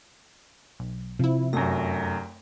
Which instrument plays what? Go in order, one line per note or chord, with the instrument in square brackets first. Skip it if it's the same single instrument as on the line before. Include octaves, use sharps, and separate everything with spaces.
[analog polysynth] B1
[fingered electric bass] C3 [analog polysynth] F3 E4
[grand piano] F1 F#2 [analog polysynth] A#6